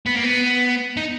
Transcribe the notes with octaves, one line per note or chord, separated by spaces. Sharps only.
B3
A#3
B3
D#4